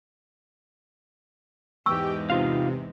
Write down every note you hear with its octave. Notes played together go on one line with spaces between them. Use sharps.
E2 G#2 G#3 G4 G5 C#6 E6
C3 D#4 F4 F5